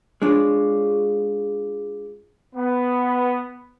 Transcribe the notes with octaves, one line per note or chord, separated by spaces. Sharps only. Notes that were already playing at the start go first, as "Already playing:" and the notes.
G#3 D4 F4 C#5
B3